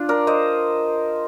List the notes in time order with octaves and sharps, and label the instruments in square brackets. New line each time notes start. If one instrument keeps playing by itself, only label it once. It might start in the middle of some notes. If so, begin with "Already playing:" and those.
Already playing: [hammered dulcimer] D4 F4
A#4 D5
C5 D#5